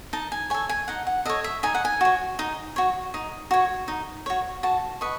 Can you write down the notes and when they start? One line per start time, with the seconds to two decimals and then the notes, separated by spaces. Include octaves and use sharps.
0.13 D#4 A5
0.32 G#5
0.50 A4 C#5 G#5
0.69 G#5
0.88 D#4 F#5
1.07 F#5
1.25 A4 C#5 D#5
1.44 E5
1.63 D#4 G#5
1.75 F#5
1.85 G#5
2.01 F#4 C#5
2.39 D#4
2.76 F#4 C#5
3.14 D#4
3.51 F#4 C#5
3.88 D#4
4.26 F#4 C#5
4.63 F#4 A5
5.01 B4 D#5 C#6